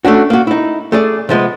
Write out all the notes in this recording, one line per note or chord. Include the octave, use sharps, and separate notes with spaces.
A3 C#4 D4 F#4
A#3 F#4
D#4 E4
A3 G#4 D5
C3 F3 G#3 B3